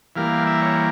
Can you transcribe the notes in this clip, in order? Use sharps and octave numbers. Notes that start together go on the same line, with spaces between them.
E3 G3 A#3 F5
E5
C#5